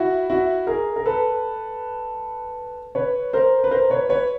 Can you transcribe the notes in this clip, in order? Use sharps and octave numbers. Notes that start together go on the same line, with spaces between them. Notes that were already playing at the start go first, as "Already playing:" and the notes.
Already playing: E4 F#4
E4 F#4
G#4 A#4
A#4
A4 B4
B4 C#5
A#4 C5
B4
A#4 C5
B4 C#5
B4 C#5